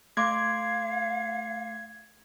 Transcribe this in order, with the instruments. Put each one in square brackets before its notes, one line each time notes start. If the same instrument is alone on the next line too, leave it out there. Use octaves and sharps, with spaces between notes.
[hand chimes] A3 C6 D6 [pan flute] F5 [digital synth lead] G#6